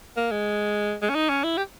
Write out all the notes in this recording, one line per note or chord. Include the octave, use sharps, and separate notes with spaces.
A#3
G#3
G#3
C#4
D#4
C#4
E4
G4